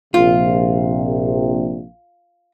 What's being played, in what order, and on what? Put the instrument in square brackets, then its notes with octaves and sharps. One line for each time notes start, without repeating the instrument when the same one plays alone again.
[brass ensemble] A#1 C3 [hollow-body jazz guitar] F4